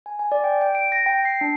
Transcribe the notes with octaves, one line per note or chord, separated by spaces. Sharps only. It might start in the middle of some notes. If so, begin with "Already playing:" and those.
G#5
G#5
D5
G5
G5
D7
A#6
G5
C7
D4